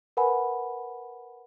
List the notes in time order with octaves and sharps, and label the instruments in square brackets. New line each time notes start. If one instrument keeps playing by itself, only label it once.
[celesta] A#4 B4 F#5 G#5 B5